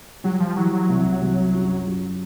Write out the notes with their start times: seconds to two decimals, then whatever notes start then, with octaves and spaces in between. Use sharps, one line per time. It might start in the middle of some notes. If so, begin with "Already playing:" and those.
0.24 F#3 G3
0.40 F3
0.56 E3 F#3
0.73 F#3
0.89 C2
1.21 C2
1.54 F#2
1.87 F#2